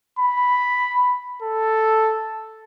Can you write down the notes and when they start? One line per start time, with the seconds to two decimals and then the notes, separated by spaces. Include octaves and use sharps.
0.19 B5
1.42 A4